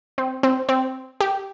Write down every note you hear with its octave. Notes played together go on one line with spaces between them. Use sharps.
C4
C4
C4
G4